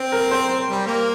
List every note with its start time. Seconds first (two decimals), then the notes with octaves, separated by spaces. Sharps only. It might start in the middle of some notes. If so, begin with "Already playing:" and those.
Already playing: C4
0.12 A#4
0.31 C5
0.69 G3
0.87 A#3